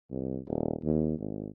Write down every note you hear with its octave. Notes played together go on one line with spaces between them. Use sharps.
C2
D#1
D#2
G#1